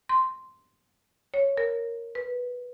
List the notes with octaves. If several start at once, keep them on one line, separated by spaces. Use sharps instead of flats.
C6
C#5
A#4
B4